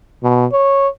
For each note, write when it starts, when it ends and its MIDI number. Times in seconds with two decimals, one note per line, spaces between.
0.23 0.46 47
0.53 0.88 73